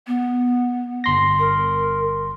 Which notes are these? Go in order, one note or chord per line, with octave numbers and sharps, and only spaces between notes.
B3
G1 C6 A#6
A#4